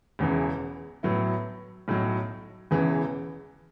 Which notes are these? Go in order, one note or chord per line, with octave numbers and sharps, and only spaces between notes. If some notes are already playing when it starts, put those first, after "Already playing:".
E1 E2 C#3 E3
A2 F#3 B3 E4
B1 A2 F#3
E1 E2 C#3 E3